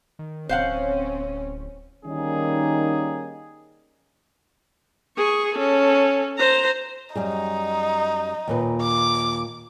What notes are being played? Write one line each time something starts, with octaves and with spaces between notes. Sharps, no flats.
D#3
D1 C4 C#4 C5 F5 F#5
D#3 G3 A#3 C#4 D#4 G#4
G#4 C#6
C#4 A4
C5 A#5
F#2 G3 D#4 G#4
D#2 A#2 B4
D6